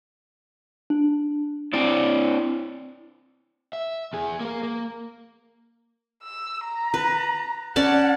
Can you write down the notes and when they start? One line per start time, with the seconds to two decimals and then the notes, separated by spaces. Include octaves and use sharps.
0.90 D4
1.73 C4 D4 E4 D5
3.73 E5
4.13 E2 G#4
4.40 A#3 A#4
4.63 A#3
6.23 E6
6.65 A#5
6.94 B4
7.76 C#4 D5 F#5 A5